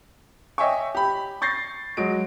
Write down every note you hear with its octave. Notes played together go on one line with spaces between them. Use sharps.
C#5 D#5 E5 G5 G#5 C#6
G4 B5
C#6 G6 A6 A#6 C7
F#3 G#3 F#4 D7